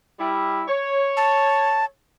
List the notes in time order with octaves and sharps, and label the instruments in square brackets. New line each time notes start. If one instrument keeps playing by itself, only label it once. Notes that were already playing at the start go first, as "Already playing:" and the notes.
[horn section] G3 E4
C#5
[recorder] A5